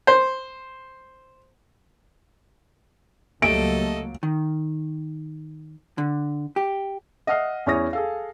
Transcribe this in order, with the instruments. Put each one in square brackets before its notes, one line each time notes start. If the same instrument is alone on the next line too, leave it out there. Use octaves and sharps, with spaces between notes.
[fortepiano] C5
[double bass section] C#2 F#3 A#3 [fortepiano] G3 A3 [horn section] A4 D#5 [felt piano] D7
[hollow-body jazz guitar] D#3
D3
G4
[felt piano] D#5 E5 F#5 D#6 F6 C7
E2 C#4 E4 C#5 D#6 A#6
G#4 A4 F5